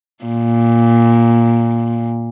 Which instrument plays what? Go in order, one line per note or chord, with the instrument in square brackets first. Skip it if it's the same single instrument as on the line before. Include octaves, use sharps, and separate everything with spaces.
[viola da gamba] A#2